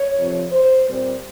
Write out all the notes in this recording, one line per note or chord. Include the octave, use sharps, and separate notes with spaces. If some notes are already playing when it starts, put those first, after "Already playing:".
Already playing: C#5
F2 C3 F3
C5
A#2 G3 C4 C5